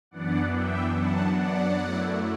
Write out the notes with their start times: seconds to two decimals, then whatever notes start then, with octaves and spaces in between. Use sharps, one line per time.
0.11 F#2 E3 B3 D4 D5 F#5
0.53 E5 G5
0.95 F#2 F#3 B3 D4 F#5 A5
1.37 D5 F#5
1.78 F#2 F#3 A3 E4